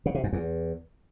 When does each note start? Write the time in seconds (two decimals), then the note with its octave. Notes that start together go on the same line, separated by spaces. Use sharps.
0.06 C#3
0.15 C3
0.24 F#2
0.33 E2